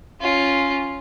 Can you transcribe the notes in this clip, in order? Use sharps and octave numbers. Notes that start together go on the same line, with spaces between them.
C#4 F4